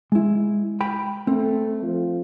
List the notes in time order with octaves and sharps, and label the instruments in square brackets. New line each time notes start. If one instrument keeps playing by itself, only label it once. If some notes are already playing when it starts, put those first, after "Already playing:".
[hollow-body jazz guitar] G#3 E4
G5 B5
[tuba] A3 [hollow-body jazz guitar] C4
[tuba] F3